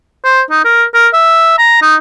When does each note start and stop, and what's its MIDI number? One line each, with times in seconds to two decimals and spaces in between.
0.24 0.42 72
0.50 0.63 63
0.65 0.84 70
0.94 1.08 70
1.14 1.58 76
1.59 1.81 82
1.82 1.95 63